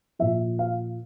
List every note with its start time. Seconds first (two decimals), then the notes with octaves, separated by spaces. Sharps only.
0.19 A#2 F3 E5
0.59 F5